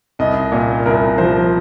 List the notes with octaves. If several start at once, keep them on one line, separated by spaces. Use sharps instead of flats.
C2 D#5
A#2
C2 A#4
F3 C5